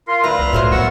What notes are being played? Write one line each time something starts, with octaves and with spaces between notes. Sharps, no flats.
F4 A#4 C6
D2 F4 B4 E5 F5 A#5
C2
A2 F#3 A3 C5
A#3 B3 F#4 A4 A#4 F#5 C#6 E6